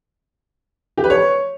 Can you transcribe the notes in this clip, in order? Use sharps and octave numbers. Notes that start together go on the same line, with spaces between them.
G4
B4
C#5